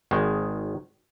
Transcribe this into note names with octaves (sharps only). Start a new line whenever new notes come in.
G#1 D#3 G#3